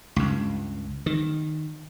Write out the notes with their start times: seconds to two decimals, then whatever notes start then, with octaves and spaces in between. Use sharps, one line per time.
0.16 C#2 G2
1.06 D#3